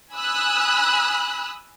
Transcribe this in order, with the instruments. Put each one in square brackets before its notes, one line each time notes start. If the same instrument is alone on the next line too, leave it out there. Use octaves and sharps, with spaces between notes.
[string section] G#5 B5 D#6 E6 F#6